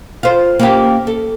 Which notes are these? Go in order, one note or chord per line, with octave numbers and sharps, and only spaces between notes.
F4 C5
A#3 C#4 G4
A4